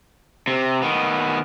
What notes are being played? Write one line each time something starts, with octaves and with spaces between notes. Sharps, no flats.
C3
D#3 B3